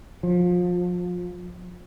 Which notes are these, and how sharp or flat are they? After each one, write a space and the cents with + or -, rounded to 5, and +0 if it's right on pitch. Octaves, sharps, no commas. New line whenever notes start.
F3 +30